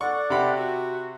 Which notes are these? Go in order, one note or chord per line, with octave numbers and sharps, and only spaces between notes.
A4 D5 F#5 C#6
C3 G4 B5
F#4